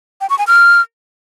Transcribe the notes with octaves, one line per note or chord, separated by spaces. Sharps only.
G5
C#6
G#5
F6